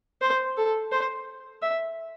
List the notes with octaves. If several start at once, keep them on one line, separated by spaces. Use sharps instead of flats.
C5
A4
C5
E5